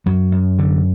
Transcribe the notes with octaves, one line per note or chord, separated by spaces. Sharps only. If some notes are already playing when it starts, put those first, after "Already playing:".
F#2 F#3
F#2
D3